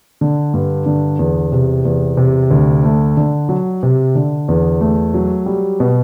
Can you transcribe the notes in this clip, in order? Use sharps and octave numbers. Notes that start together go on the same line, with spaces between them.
D3
G2
D3
E2
C3
E2
C3
D2
A3
D3
F#3
C3
D3
E2
A3
F#3
G3
B2